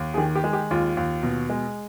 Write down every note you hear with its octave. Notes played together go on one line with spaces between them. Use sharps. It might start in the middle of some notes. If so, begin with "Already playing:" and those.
Already playing: D#2
G#4
D#3 G4
G4
G#3
G4
D#2 F4
D#2
B2
G#3